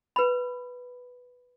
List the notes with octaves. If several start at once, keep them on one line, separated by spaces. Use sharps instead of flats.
B4 B5